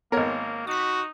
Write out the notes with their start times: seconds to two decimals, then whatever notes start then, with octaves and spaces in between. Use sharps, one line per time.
0.12 G#1 A#3 B3 A#4 C#5
0.67 D#4 F#4 D6 B6